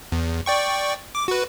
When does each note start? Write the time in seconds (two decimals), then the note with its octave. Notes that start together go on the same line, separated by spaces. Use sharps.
0.12 E2
0.46 D5 G5 C#6
1.15 D6
1.28 F#4 B4